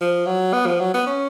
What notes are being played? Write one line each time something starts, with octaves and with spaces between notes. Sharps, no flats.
F3
F#3
B3
F3
F#3
B3
C#4